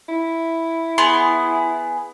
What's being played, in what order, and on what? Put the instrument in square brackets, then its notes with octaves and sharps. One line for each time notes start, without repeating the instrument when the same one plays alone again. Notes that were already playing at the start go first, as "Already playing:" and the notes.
[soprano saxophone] E4
[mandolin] B3 G#4 C6